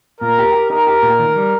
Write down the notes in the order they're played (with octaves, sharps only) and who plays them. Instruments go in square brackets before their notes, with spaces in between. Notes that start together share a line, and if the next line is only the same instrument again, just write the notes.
[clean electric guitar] A#2 [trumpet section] A#4
[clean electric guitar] G4
G4
[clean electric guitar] D#4 [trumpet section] A#4
[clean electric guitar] G4
A#2
D#3
G3